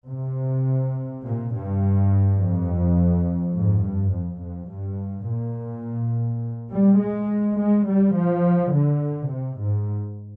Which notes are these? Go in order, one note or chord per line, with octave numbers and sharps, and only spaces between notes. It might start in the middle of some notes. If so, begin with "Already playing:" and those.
C3
A#2
G2
F2
G#2
G2
F2
F2
G2
A#2
G3
G#3
G#3
G3
F3
D3
C3
G#2